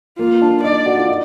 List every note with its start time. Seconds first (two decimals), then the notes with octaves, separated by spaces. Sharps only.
0.19 A#3 F4
0.42 D4
0.64 D#4 D5
0.86 F#4
0.97 F4
1.09 D#4